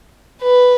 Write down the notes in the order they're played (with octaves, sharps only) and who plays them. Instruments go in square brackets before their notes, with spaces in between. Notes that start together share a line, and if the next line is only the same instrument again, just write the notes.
[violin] B4